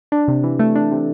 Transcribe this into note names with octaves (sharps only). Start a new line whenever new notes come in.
D4
C3
E3
A3
D4
C3